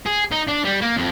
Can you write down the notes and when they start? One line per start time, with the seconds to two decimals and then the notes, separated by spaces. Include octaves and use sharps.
0.06 G#4
0.31 D#4
0.47 D4
0.64 G3
0.82 A#3
0.98 F2